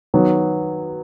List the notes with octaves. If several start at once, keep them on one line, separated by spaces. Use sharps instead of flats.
D#3 F#3 B3 F#4